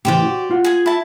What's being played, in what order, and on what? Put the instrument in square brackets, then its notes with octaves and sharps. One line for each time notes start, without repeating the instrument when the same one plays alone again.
[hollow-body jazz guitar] A2 C#3 E3 [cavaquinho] G4 C5 D5
[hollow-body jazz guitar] F#4
F4 F#5
[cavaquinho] G#4 G#5
E4 A5